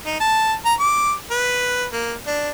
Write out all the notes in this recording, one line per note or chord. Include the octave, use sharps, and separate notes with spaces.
D#4
A5
A#5
D6
B4
A#3
D4